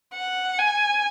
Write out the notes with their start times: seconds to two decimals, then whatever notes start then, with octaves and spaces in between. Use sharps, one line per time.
0.14 F#5
0.59 G#5